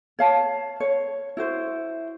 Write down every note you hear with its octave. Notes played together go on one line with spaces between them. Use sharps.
C#5 F5 A5
C#5
E4 F#4 C5